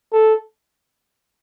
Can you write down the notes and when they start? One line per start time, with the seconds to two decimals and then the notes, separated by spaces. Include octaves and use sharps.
0.13 A4